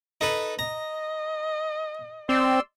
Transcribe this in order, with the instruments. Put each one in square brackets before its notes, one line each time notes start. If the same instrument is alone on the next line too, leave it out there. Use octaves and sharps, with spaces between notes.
[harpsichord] D#4 A4 B4
[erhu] D#5 [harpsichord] A#5
[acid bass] C4 [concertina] D5 C6 E6